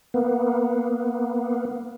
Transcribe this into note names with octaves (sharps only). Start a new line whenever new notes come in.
A#3 B3